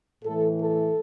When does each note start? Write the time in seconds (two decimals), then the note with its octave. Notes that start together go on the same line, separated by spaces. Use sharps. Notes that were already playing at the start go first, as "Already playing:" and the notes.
0.24 A2 E3 A3 A4
0.58 A4